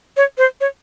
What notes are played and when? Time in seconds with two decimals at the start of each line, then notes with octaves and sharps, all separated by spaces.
0.17 C#5
0.38 C5
0.61 C#5